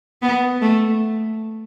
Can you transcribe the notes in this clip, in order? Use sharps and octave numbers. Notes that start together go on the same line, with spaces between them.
B3
A3